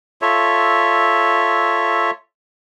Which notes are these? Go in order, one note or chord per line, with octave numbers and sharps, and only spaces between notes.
F4 A4 C#5 E5